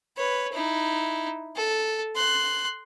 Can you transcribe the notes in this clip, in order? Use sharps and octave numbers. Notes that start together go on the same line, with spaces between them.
B4 C#5
D#4 E4
A4
C6 F#6